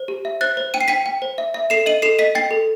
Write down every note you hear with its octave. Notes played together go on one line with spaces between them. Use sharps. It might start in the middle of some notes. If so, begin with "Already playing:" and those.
Already playing: C5
G4
E5
C5 F#6 A6
C5
G5 D#7
C7
G5 B6 D#7
G5
C5
E5
E5
A4 C7 E7
D#5 D#7 F#7
A4 C7 E7
D#5 B6 D#7
G5 A6 C7
A4